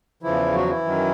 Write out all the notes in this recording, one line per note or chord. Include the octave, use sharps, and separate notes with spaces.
E2 C#3 E3 F3 E4
F#3 F#4
E3 E4
F#2 D#3 F#3